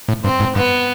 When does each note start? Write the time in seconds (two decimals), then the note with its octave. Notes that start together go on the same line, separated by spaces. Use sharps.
0.09 A2
0.24 G2 C4
0.40 G#2
0.56 G2 B3